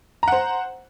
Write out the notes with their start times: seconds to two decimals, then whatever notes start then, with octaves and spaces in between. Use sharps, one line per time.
0.23 A#5
0.28 F#5
0.32 C5